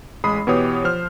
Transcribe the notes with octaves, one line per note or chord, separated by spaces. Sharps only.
A1 G#3 B5 D#6 C7
B2 E3 B3 G4 C#5 D#6
F3 C5 F6